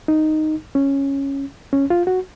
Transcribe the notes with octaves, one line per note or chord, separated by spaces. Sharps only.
D#4
C#4
C#4
F4
F#4